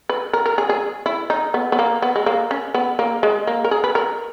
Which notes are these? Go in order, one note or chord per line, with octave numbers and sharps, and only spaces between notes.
B4
A#4
A#4
G#4
G#4
E4
D#4
B3
B3
A#3
B3
G#3
A#3
C#4
B3
A#3
G#3
A#3
A#4
G#4
B4
A#4